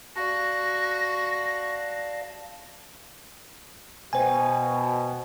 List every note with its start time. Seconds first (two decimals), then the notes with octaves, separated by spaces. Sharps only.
0.16 F#4 D5 F5 A5 A#6
4.13 B2 C5 G5 G#5